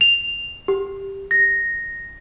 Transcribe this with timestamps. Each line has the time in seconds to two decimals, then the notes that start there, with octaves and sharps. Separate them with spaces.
0.01 F7
0.68 G4
1.31 A#6